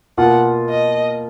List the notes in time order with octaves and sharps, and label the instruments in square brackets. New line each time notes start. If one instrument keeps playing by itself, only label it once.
[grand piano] B2 A#3 F4 [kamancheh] F#5
[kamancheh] D#5